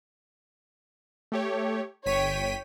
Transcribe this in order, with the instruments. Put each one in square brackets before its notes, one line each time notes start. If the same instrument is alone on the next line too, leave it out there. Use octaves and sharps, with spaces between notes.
[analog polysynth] A3 G4 C#5
[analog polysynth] G1 B6 D#7 [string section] C#5 G5